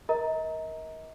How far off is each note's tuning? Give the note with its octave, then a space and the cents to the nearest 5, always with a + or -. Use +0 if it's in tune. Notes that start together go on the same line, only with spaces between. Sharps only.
A#4 +15 D#5 +40 A#5 +0